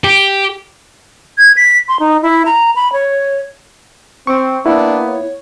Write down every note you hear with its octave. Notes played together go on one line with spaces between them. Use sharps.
G4
G#6
B6
C6
D#4
E4
A#5
B5
C#5
C4 C#6
A#3 B3 D4 E4 B5
C#5